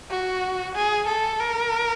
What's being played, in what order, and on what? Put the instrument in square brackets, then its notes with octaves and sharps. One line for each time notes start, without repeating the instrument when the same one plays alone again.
[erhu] F#4
G#4
A4
A#4